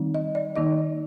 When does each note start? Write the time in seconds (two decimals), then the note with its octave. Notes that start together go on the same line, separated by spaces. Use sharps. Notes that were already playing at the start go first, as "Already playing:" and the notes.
Already playing: D#3 G3 C4 D#4
0.14 D#5
0.35 D5
0.56 D#3 A#3 D#4 D#5